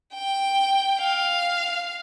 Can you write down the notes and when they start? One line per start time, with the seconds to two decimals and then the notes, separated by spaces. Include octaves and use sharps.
0.14 G5
1.00 F5